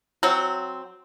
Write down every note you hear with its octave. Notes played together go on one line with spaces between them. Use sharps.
F#3 C4